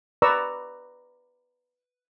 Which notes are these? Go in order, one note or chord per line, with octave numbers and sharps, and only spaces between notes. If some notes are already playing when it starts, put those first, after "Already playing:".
B4 D5 A#5 C#6 E6